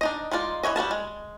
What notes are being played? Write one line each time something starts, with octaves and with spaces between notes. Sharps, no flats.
D4 D#4 D#5
G#3 D#4 F4 D5
E3 F#3 C#5 D#5
G3 F#4 A#4 A5
G#3